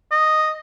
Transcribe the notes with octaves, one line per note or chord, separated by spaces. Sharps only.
D#5